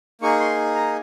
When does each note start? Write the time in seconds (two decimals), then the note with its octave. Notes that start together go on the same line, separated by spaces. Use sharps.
0.21 A#3 D#4 G#4 C#6
0.40 C6
0.75 A#5